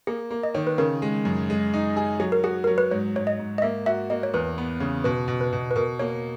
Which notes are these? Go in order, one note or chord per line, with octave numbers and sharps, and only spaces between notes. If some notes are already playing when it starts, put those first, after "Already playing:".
A#3 G#4
A#3
D#5
D#3 C#5
B4
C#3 A#4
G#3
F#2
G#3
D#4
G#4
F#3 G#4
A#4
F#4 G#4
F#3 A#4
B4
G#2 C#5
G#2 C#5
D#5
G#2
D#5
A#3 E5
F#4 E5
A#3 D#5
C#5
E2 B4
B3
C#3
B2 B4
B2
B4
B2
B4
B2 A#4
A#3 C#5